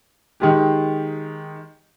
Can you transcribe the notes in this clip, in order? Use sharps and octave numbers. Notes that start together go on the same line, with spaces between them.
D#3 G#3 G4